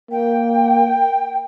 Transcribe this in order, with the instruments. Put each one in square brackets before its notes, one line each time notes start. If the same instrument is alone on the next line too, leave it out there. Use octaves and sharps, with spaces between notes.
[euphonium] A#3 [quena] G5